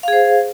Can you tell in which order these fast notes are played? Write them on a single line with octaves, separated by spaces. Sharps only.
F5 G#4 C5